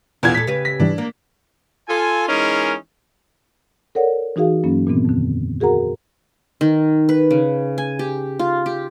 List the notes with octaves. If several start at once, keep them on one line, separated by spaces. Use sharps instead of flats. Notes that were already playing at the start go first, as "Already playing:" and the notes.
E2 B2 D3 E4 F4 G#6
A#2 A4 B6
C#3 G4 B4
A#6 B6
G#2 E3 G3 D4
A#3
F4 A4 G#5
E3 G#3 C#4 D#4 G#4 A#4
A4 A#4 C#5 D5 F#5
E3 D#4 F#4 G#4 F5
G2 F#3 A#3 C#4
A#2 D#3 E3 B3 C4
F2 D3
F#4 G#4 A#4 F#5 A#5
D#3
B4
C#3
G#5
G4
F4
G4